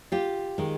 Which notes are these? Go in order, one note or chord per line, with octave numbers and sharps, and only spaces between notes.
F4 G4
D#3 G#3